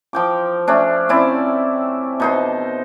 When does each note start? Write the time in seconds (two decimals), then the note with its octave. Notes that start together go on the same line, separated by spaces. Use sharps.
0.13 F3 G5 D6
0.68 A3 C#4 D4
1.09 C4 C#4 E4 D5
2.20 B2 D#4 C5